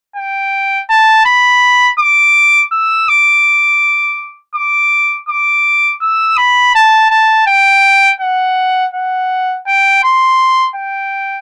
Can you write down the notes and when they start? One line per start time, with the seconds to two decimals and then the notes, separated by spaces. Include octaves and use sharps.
0.16 G5
0.90 A5
1.26 B5
2.00 D6
2.72 E6
3.08 D6
4.55 D6
5.29 D6
6.02 E6
6.37 B5
6.75 A5
7.10 A5
7.47 G5
8.21 F#5
8.94 F#5
9.67 G5
10.04 C6
10.76 G5